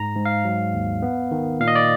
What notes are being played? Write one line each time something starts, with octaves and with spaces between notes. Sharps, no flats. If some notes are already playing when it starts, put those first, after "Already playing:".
Already playing: G#2 A#5
G#2
F5
F#3
D#2
B3
D#3
A#2 F5
D#5
D5